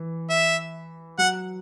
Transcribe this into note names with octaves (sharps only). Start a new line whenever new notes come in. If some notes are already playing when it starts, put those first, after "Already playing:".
Already playing: E3
E5
F#3 F#5